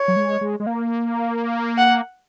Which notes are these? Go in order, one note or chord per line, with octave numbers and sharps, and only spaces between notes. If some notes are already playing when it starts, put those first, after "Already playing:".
Already playing: C#5
F#3
G#3
G#3
G#3
A#3
F#5